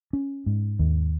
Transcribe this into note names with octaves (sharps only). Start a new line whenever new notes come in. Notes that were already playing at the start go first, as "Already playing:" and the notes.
C#4
G#2
D#2